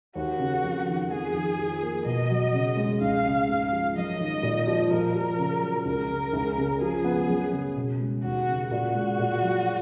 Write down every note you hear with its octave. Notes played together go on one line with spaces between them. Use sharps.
D#2 F#4
C#3
F2
D#3
F2 G#4
D#3
F3
A#3
B2 D#5
F#3
C#3
G#3
C#2 F5
C#3
G#2
F3
F#2 D#5
D#3
A#2
F3
A#2 A#4
F3
C#3
F#3
C#2 A#4
C#3
C#2
C#3
F3 G#4
B3
F#2
C#3
B2
G#3
D#2 F#4
C#3
A#2 F#4
G#3
A#2
F#3